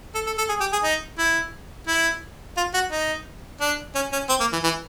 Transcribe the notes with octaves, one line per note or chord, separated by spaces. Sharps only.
A4
A4
A4
G#4
G4
G#4
D#4
E4
E4
F4
F#4
D#4
D4
C#4
C#4
C4
A#3
E3
E3